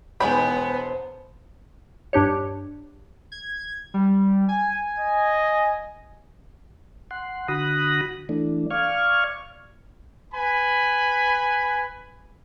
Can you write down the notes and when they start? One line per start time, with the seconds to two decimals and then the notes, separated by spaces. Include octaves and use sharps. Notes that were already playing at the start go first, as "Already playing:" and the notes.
0.20 E1 G#2 G#3 B3 C#5 G5 B5
0.58 C5
2.13 G2 D4 G4 C#5
3.32 G#6
3.94 G3
4.49 G#5
4.98 D#5
7.11 F#5 C6
7.48 D3 F#4 B5 D#6 F#6 A#6
8.29 E3 A3 D4
8.70 D5 F5 C#6 F6 G#6
10.33 B4 G#5 B5